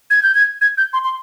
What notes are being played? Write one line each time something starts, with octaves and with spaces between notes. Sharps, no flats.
G#6
G6
G#6
G#6
G6
C6
C6